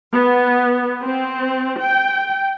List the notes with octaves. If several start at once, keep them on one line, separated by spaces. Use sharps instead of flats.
B3
C4
G5